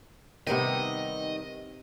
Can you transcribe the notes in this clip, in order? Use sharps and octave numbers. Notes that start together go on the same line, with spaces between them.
C3 D#3 G3 B3 D#4 D#5 G5